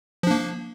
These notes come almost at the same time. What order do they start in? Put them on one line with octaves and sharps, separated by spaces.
F3 D4 A#3